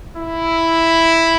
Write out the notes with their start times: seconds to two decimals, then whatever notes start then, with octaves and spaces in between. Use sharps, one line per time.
0.17 E4